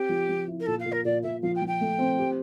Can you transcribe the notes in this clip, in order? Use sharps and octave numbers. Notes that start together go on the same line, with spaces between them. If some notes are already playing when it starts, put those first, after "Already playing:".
Already playing: C4 G4
F3
F3
E4
A#4
A#2 A4
F5
A#2
A#4
A#2 D5
A#2 E5
F3 F5
G5
F3
G5
A3
C4
G4